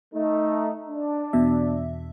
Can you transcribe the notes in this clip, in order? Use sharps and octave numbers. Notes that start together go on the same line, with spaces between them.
A3 D#4
D4
E2 B2 E5